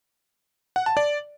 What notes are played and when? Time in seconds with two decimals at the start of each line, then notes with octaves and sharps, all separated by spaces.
0.76 F#5
0.86 A5
0.97 D5